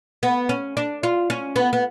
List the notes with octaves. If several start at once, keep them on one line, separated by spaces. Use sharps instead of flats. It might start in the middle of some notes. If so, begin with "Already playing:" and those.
B3
C#4
D4
F4
C#4
B3
B3